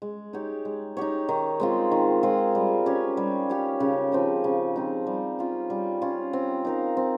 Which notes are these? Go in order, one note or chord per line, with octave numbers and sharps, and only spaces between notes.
G#3
D#4 G4 C#5
G#3
D#4 G4 C#5
D#3
G#3 C4 F4
D#3
G#3 C4 F4
G3
C#4 G4 C#5
G3
C#4 G4 C#5
C#3
F3 C4 D#4
C#3
F3 C4 D#4
G3
C#4 F4
G3
C#4 F4
C4
D#4 A#4 F5
C4